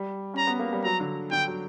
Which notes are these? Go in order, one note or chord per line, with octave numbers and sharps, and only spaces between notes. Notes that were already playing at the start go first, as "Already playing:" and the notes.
Already playing: G3
C#4 A#5
B3
A#3
G3
F#3 A#5
D3
D3 G5
F#3